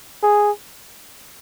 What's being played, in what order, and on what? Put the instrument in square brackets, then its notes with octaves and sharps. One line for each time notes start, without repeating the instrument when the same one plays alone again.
[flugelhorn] G#4